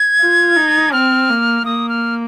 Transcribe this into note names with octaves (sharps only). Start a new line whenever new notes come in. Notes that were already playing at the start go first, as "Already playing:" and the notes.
Already playing: G#6
F4
D#4
C4 F6
A#3
A#3 D#6
F6